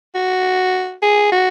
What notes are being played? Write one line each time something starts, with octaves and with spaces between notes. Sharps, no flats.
F#4
G#4
F#4